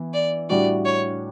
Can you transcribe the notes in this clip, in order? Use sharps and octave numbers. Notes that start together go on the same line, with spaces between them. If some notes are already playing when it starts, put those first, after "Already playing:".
Already playing: E3 B3
D5
A2 G3 D4 F#4 D5
C#5